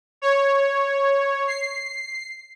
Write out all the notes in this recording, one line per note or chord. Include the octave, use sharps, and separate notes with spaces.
C#5
C7